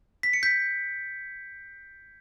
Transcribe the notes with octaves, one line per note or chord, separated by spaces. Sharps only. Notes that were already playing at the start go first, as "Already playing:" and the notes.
B6
C#7
G6 B6